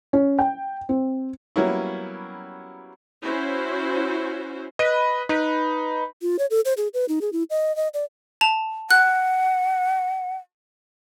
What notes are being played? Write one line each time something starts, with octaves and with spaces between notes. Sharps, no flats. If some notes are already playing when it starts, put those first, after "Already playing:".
C#4
G5
C4
F#3 G3 A#3 B3 C#4 E4
C#4 E4 F#4 C5
B4 D#5
D#4 B4
F4
C#5
A4
C5
G#4
B4
D#4
G#4
E4
D#5
D#5
D5
A5 F7
F#5 F#6